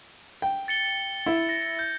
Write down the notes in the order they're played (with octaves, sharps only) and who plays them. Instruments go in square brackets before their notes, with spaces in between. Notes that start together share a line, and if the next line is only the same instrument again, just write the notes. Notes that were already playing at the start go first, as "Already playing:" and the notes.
[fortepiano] G5
[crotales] A6 C#7 G7
[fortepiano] E4
[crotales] A#6
G6